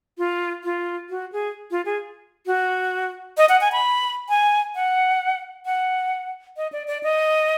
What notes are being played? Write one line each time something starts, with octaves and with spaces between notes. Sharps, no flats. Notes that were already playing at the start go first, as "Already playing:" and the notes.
F4
F4
F#4
G#4
F4
G#4
F#4
D#5
F#5
G#5
B5
G#5
F#5
F#5
D#5
D5
D5
D#5